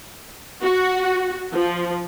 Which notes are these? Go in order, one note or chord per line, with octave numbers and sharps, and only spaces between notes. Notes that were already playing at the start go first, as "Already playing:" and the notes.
F#4
F3